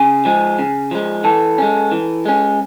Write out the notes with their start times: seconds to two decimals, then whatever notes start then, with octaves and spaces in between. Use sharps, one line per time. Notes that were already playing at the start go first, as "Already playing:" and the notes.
Already playing: C#3 G#4
0.25 F3 G#3
0.59 C#3
0.91 F3 G#3
1.24 E3 A4
1.58 G#3 C#4
1.92 E3
2.25 G#3 C#4